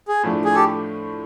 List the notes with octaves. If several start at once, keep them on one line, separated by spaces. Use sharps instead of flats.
G#4
A2 F3 A3 D4
G#4
G4 A4